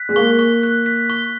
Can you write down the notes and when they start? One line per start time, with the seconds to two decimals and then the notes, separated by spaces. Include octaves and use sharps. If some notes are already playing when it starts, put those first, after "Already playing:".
Already playing: F#6 B6
0.09 G#3
0.16 A#3 C#6
0.39 C#6
0.63 F#6
0.86 B6
1.10 C#6